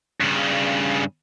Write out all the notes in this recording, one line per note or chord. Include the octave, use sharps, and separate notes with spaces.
G2 C#3